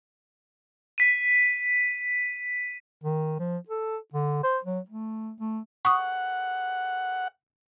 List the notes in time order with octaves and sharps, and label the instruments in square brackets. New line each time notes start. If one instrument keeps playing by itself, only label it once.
[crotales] B6 D#7
[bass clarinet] D#3
F3
A4
D3
C5
F#3
A3
A3
[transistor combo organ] F#5 [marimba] C#6 D#6